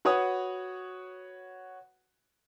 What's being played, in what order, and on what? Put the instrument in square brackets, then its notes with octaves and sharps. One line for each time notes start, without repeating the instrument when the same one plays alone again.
[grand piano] F#4 B4 C#5 F#5 D#6